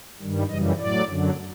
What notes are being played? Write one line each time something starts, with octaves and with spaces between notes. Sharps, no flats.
G2 D#3 G3
F#2 C#3 E3 G3 D#5
A2 F#3 D5
F#2 D3 F#3